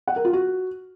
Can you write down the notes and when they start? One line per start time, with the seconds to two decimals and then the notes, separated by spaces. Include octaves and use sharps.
0.07 F#5
0.16 A#4
0.25 F4
0.33 F#4